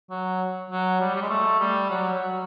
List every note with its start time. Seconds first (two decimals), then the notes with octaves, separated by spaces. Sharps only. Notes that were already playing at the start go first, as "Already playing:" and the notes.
0.10 F#3
0.70 F#3
1.00 G3
1.15 G3
1.22 G#3
1.30 A3
1.60 G3
1.90 F#3
2.13 F#3